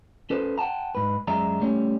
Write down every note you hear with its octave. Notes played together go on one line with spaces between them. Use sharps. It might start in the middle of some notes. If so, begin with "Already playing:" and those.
C#4 A4 B4 C5
F#5 G5 A5 A#5
G#2 B4
F#2 G#3 D5 E5 A#5
G3 A3 C#4 C#5